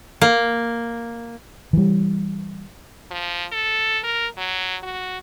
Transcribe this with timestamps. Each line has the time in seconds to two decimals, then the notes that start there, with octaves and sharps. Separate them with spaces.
0.21 A#3
1.73 E3 G3
3.11 F3
3.52 A4
4.04 A#4
4.37 F#3
4.83 F#4